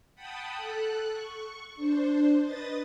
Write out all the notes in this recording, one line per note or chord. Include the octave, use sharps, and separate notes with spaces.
F#5 G5 A5 B5 D#6
A4 F#6
C#6
D4 C5
B4 D#5 D#6 A6